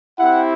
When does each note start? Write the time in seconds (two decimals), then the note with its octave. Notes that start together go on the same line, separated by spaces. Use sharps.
0.19 C4 E4 G4 F#5